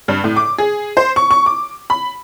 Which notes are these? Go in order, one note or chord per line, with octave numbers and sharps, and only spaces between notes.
G2
A2
D6
G#4
C5
C#6
C#6
D6
B5